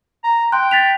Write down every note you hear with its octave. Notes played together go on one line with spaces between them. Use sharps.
A#5
G5 C6 F#6
A6 B6 F7